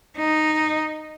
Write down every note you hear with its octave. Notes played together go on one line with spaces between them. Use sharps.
D#4